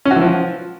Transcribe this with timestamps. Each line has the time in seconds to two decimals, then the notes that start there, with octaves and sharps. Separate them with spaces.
0.05 C#4
0.11 F#4
0.16 E3
0.21 F3